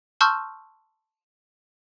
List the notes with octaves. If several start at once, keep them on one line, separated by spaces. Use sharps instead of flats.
A5 C6 C#6 E6 F6 G6